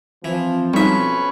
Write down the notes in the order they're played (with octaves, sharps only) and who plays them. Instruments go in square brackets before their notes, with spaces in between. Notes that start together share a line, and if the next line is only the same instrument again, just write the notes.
[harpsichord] E3 [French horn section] F3 C4
[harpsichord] B1 E5 [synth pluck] G3 D#4 [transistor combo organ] C#4 B4 C#6